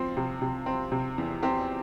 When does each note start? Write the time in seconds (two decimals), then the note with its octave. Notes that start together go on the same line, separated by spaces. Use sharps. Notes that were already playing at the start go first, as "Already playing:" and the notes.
Already playing: F3 C4
0.17 C3
0.42 C3
0.66 C4
0.92 C3
1.18 E2
1.43 C4 G4